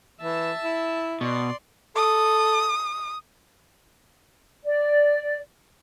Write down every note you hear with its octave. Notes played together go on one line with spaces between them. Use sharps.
E3 E5 A5
E4
B2 D5 C6
A4 D#6
D5